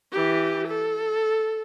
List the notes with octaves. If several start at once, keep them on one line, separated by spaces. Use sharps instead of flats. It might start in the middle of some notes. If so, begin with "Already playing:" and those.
E3 G4
A4